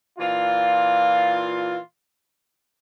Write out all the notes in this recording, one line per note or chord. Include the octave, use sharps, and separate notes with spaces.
A#2 E3 F4